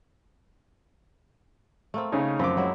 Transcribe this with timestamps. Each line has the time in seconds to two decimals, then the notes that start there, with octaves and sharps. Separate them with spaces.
1.94 A3 A#3 C4
2.12 C#3 C#4 D#4
2.39 F#2 F3 C4 D6
2.57 F#3 G#3 E4